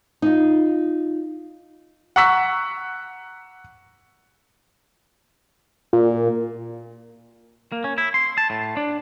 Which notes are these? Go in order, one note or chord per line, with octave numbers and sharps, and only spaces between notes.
D#4 F4
F#5 A#5 C#6 E6 B6
A#2
A#3
C#4
E4
C6
A5
A2
D4